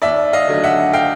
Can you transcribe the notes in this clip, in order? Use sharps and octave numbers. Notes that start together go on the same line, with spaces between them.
D#2 D5 E5
D#5 F5
D3 F#3 A3
E5 F#5
F5 G5